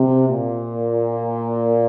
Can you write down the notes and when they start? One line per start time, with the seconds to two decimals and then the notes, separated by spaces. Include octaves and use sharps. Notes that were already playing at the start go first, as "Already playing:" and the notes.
Already playing: C3
0.28 A#2